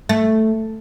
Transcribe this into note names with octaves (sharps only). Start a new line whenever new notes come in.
A3